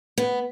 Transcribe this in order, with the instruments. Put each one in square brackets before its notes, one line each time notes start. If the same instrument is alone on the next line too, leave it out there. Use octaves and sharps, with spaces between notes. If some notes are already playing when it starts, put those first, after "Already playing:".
[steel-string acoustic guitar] B3